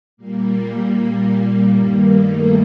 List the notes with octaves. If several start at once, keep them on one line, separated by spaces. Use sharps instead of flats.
A#2 G3 A#3
G2 D#3 G3 A#3
A3